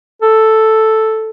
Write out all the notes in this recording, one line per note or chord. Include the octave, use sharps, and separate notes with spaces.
A4